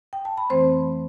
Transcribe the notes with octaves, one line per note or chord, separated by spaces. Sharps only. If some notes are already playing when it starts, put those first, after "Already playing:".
G5
A5
B5
F2 E3 A3 C4 C5 C6